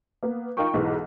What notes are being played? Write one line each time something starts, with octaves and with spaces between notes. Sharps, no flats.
A#3 B3
D#4 F4 A#4 G5 C#6
B1 G#2 E3